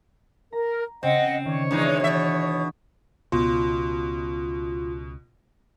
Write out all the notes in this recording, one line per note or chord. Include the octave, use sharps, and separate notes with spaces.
A#4 A#5
C#3 C4 D#5 F#5
D#3 C#5 D5 D#7
E2 E3 G#3 D4 D#4
B2 E5
C#2 B2 F4